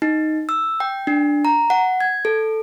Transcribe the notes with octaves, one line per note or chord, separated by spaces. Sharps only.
D#4
E6
G5
D4
A#5
F#5
G#6
A4